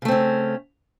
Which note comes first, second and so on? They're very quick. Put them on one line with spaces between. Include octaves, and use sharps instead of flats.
C#3 A3 C4 C#4